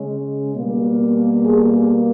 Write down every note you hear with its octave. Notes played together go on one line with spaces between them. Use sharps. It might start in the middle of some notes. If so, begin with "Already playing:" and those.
Already playing: C#3 G#3 C#4
B2 G3 A#3
G#4